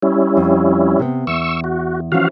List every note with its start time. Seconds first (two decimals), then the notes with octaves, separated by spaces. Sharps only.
0.02 G3 C#4 E4
0.37 F2
0.99 C3 B3
1.27 E2 C#6 E6
1.64 F#4
2.12 E3 F3 C#4 F#4 F5